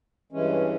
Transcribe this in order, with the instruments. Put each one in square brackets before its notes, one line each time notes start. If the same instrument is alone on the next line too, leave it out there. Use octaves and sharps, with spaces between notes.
[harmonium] G2 E3 G#3 C#4